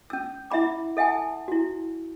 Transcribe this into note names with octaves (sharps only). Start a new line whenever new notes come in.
C#4 E6
E4 E5 F#5 B5 D6
A4 E5 F#5 G#5 A5
E4 F#4